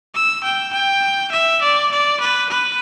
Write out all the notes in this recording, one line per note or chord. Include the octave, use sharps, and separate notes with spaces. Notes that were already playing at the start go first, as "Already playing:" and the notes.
E6
G5
G5
E5
D5
D5
B4
B4